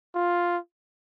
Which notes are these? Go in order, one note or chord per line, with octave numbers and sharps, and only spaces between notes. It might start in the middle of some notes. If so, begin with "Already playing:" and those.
F4